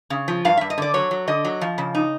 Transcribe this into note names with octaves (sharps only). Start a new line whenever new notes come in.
C#3
F3
G2 F5
G2 E5
D#5
D3 D5
F#3 C#5
F#3
D3 D#5
F#3
F3
C#3
D#4